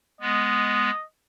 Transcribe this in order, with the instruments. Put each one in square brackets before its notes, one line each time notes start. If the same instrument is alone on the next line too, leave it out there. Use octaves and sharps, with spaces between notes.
[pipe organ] G#3 B3 [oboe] D#5